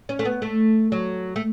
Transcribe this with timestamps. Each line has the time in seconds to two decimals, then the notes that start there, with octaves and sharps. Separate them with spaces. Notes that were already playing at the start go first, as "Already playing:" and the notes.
0.09 C#4
0.19 A3
0.25 B3
0.42 A3
0.92 F#3
1.36 A3